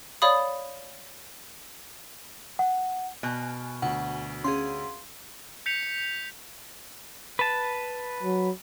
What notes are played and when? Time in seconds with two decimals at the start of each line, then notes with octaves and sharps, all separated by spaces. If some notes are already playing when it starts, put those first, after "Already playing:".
0.22 C#5 D5 F5 B5 D#6
2.59 F#5
3.23 B2 G#5 F6
3.82 D2 F#5
4.44 C#4 G#4 F5 C6
5.66 G6 B6 C#7 F7
7.39 B4 A5
8.23 F#3